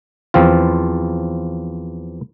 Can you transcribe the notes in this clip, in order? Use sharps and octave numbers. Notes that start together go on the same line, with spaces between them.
E2 F3 C4 F4